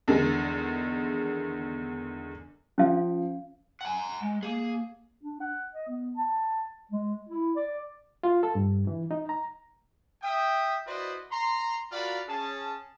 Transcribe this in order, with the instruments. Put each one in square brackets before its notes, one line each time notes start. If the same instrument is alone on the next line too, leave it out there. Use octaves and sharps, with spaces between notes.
[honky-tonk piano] E2 D3 D#3 G#3
[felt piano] F3 [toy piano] C#4 F5
[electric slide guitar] F#5 G#5
[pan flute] G#3
[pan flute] A#3 [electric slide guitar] G#4
[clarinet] D4
F#5
D#5
B3
A5
G#3
E4
D5
[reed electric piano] F4
A4
G2
E3
D#4
A#5
[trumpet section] E5 G5 D#6
E4 F#4 B4 C5 D5 D#5
A#5 C6
F4 F#4 A#4 D5 F5 B5
C#4 G#4 A5